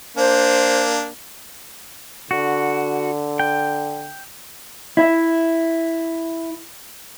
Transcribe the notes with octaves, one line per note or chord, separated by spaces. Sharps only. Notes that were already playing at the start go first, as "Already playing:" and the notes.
A#3 D4 C5
D3 F#4
G5
E4 E5